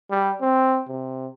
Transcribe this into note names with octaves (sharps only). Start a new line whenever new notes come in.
G3
C4
C3